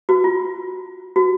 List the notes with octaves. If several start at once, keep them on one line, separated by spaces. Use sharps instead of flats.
F#4
F4
F#4